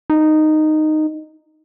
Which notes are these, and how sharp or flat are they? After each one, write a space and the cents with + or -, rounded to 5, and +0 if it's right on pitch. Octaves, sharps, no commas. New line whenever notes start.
D#4 -10